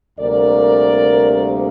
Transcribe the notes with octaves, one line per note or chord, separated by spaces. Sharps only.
D2 C3 G3 A#3 A#4 D5